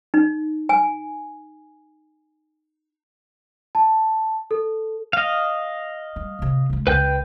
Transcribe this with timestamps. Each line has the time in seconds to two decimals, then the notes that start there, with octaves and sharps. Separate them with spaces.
0.14 D#4
0.69 G#5
3.75 A5
4.51 A4
5.13 D#5 F5
6.16 G3
6.39 A2 C3
6.70 C3 G#3
6.87 C#2 C#3 B4 G5 G6